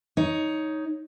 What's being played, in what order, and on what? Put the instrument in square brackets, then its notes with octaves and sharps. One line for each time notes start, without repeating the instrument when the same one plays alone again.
[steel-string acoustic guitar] D#4 C#5